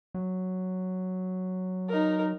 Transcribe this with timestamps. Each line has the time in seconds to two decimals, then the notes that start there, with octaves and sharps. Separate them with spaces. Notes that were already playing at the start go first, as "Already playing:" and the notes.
0.14 F#3
1.89 D#4 A#4